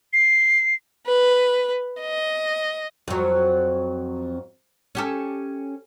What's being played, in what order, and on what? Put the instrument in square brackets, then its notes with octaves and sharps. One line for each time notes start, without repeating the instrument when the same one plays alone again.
[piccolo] C7
[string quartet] B4
D#5
[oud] F2 F#3
C#4 G4 A4